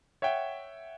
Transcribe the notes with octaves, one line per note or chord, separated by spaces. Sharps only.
C#5 E5 F#5 G5